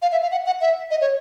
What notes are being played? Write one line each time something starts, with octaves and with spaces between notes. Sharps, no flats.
F5
E5
F5
F#5
F#5
E5
D#5
C#5